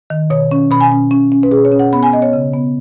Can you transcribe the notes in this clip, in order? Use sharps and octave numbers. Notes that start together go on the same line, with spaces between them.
D#3
B2 C#5
C#4
B2 B5
G#5
C#4
C#4
C#4
B4
B2 G#4
C#5
C#4
F#5
B3 B5
G#5
B3 D#5
C#5
C#3
B3